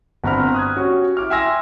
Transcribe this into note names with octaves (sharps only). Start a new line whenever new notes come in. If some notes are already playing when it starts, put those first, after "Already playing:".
G1 C4 A#5 B5 F6
D#6 F#6 G#6
C#4 F#4 G4
E4 D6 F6
E5 G5 G#5 C6 E6 A#6